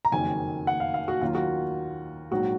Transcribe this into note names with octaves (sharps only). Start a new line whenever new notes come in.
A#5
F#1 F2 D#3 F#3 G#5
F#5
F5
F5
F#4
D#2 D#3 F#3 F4
F#4
A#1 G#2 F#3 F#4